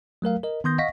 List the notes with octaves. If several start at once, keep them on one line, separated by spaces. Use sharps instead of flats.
F#3 A3 A#4 F5
A#4 D#5
D#3 B3 C6 D#6 G6 A#6
D#5 F5 F#5 C#6 A#6 B6